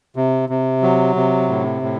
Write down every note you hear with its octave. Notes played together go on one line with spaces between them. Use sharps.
C3
C3
F#3
C3
A2
A2